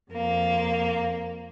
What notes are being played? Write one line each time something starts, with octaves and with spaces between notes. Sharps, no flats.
F2 A#3